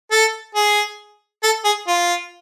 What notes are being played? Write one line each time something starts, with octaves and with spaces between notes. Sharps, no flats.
A4
G#4
A4
G#4
F4